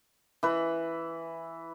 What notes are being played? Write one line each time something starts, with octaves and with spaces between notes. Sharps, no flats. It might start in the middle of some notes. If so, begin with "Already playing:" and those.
E3 B4